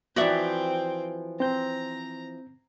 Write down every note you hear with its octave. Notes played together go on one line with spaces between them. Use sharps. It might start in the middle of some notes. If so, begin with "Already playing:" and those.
E3 F3 C4 F#4 D5 E5 G5
C4 A#5 G6